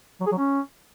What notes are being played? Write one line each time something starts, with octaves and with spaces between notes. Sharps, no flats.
F#3
G#4
F#3
C#4